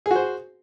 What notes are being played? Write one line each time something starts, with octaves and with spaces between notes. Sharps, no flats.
F#4 G#4 C5